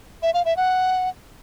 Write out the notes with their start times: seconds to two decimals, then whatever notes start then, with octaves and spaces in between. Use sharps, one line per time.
0.22 E5
0.34 F5
0.45 E5
0.57 F#5